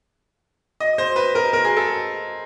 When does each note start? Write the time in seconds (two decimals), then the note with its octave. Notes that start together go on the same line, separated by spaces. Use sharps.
0.80 D#5
0.98 C5
1.16 B4
1.35 A#4
1.53 A#4
1.65 G#4
1.77 A4